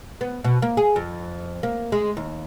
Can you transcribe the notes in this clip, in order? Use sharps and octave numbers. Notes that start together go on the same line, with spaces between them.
B3
B2
A#3
G#4
F2
A#3
G#3
D#2